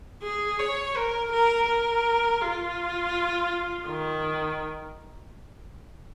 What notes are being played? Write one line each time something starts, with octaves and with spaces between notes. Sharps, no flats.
G#4
C#5
A#4
A#4
A#4
F4
D#3